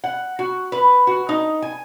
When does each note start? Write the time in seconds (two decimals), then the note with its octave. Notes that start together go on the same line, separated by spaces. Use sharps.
0.04 F#5
0.39 F#4
0.72 B4
1.07 F#4
1.29 D#4
1.62 G#5